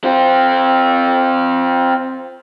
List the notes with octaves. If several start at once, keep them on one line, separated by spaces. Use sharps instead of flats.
C4 F4